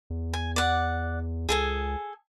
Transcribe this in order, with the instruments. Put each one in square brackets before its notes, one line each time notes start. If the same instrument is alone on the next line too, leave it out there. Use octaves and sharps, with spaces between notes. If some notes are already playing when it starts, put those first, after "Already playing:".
[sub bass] E2
[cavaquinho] G#5
D5 F#5
[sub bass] C#2 [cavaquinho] G#4 A4 G#5